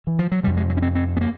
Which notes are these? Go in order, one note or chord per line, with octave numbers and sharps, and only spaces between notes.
E3
F3
F#3
F2 C3 G3
G#3
F#3
C#4
C4
C4
B3
A#3